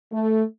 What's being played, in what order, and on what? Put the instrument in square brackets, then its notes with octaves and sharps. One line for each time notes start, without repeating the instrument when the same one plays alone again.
[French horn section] A3